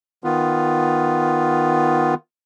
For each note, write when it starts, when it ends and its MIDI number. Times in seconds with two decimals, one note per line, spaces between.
0.24 2.14 51
0.24 2.14 59
0.24 2.14 65